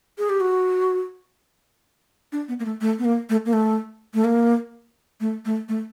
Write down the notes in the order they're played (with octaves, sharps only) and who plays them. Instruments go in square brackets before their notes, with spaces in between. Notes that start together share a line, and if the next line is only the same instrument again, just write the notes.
[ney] G#4
G4
F#4
D4
B3
A#3
A3
A3
B3
A#3
A3
A#3
A3
A3
A#3
A3
A3
A3